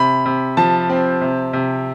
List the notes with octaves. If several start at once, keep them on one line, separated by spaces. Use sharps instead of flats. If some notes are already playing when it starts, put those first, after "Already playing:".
Already playing: C3 B5
C3
F3 A5
C4
C3
C3